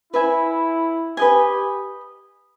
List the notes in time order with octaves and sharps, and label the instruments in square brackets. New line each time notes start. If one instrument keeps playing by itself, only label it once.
[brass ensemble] E4 [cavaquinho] B4 E5 G#5
[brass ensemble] G4 [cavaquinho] B4 D#5 G#5